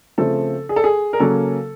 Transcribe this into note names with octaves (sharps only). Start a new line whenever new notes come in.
C#3 F3 A3 C4 A4
G#4
A4
G#4
A#4
C#3 F#3 A#3 C#4 A4